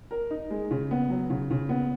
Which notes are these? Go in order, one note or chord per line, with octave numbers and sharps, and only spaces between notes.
A#4
D#4
G#3
C#3
B3
F#3
C#3
C#3
B3